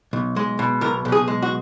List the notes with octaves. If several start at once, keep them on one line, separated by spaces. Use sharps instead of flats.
B1
G#3
B2
B1 A#4
B1
G#4
G#3
F#4